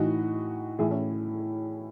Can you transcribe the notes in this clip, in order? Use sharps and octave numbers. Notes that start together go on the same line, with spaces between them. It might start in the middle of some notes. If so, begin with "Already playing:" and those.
Already playing: A2 E3 D#4 F#4
A2 E3 E4 G#4
C#4 E4